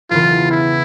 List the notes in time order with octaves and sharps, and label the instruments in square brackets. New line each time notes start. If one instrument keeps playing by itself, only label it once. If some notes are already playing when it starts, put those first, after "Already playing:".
[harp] E1 E2 C#3 E3 [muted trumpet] F4
[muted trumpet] E4